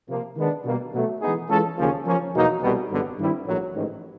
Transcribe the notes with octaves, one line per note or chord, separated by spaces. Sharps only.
C3 F3 A#3
D#3 G#3 B3 D4
B2 G3 A#3
B2 F#3 A3
E3 G#3 B3 D#4 G#4
E3 G#3 C#4 F4 A4
D#2 C#3 F3 A#3 C#4
F3 A#3 C#4
E2 B2 F#3 A#3 D#4
C2 B2 G3 B3
G#1 G2 D3 F#3 B3
G2 D#3 G3 C4 E4
A#1 A2 F#3
A1 G#2 D#3